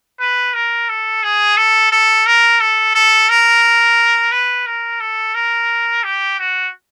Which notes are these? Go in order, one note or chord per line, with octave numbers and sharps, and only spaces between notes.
B4
A#4
A4
G#4
A4
A4
A#4
A4
A4
A#4
B4
A#4
A4
A#4
G4
F#4